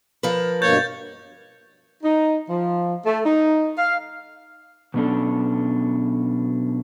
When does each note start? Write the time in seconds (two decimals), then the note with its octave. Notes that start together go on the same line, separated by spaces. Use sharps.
0.23 F3 A#4 B4
0.62 G2 B2 A#3 C#5 G6 A6
2.03 D#4
2.49 F3
3.05 A3
3.25 D#4
3.78 F5
4.94 B2 F#3 B3 C#4 D4 A4